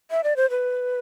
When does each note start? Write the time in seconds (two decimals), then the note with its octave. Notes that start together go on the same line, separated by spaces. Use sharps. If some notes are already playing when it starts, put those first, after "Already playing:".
0.11 E5
0.24 D5
0.37 C5
0.50 B4